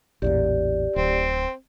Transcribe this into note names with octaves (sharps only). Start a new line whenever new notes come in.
A1 E2 A#2 G4 D5
D1 C4